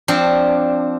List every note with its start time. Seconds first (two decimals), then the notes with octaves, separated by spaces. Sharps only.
0.08 F3 C4 D4